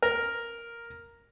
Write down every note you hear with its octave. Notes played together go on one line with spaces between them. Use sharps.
A#4